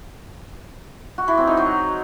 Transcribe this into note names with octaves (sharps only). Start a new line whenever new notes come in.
F#4
E3
C4
D#4
F#3